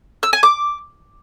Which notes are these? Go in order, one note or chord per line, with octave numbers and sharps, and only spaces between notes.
E6
G#5
D6